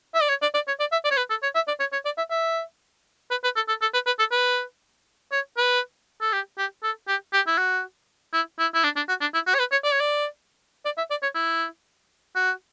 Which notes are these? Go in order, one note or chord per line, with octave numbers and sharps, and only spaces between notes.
E5
D5
C#5
D5
D5
C#5
D5
E5
D5
C#5
B4
A4
C#5
E5
D5
C#5
C#5
D5
E5
E5
B4
B4
A4
A4
A4
B4
B4
A4
B4
C#5
B4
A4
G4
G4
A4
G4
G4
E4
F#4
E4
E4
E4
D4
D4
F#4
D4
E4
F#4
C#5
B4
C#5
D5
C#5
D5
D5
E5
D5
C#5
E4
F#4